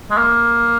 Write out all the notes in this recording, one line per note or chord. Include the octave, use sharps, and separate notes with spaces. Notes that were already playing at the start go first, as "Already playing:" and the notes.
G#3
A#3